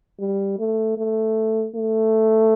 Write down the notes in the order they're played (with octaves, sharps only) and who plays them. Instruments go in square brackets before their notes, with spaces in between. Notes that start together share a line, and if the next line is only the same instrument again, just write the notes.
[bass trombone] G3
A3
A3
A3